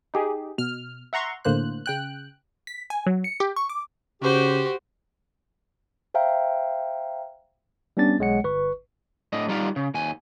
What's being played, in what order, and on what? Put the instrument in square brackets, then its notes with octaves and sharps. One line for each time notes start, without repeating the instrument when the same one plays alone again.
[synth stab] D#4 G4 G#4
B2 F6
E5 F#5 A#5 C6 C#6
A2 D3 A#3 C5 F#6
C#3 G5 F#6
B6
G#5
F#3
C#7
G4
C#6
D6
[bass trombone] C#3 [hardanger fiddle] F#4 C5 [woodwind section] G4
[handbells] C5 E5 F5 G5 A#5
[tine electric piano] G3 B3 C#4 D4 A6
B1 G#3 C#5 F#5 C#7
G1 B4 C#6
[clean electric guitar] A2 D4 D#5
G3 B3 D#4 F4 D5 F5
C#3
D#2 G#5